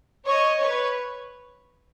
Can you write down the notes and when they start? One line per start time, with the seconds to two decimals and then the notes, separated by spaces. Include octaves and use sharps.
0.26 C#5 D#5
0.60 B4 C#5